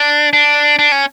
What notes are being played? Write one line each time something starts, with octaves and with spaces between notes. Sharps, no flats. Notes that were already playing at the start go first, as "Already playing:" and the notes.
Already playing: D4
D4
D4
C#4